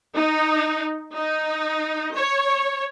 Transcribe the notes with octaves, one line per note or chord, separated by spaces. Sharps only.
D#4
D#4
C#5